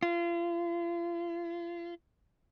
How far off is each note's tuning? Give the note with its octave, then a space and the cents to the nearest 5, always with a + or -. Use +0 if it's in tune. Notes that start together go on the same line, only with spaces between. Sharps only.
F4 -35